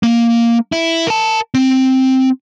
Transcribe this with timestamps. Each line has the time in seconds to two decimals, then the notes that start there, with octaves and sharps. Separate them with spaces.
0.03 A#3
0.72 E4
1.07 A#4 A5
1.55 C4